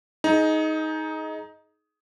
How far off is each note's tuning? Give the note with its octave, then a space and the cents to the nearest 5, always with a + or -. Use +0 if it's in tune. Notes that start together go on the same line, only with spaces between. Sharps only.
D#4 +10 G#4 +30